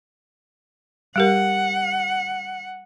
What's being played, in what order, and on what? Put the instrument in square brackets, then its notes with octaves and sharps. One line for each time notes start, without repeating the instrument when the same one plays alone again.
[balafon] G3 G4 A#4 [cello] F#5